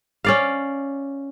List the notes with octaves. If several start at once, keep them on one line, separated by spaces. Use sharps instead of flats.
C#4 D5 F5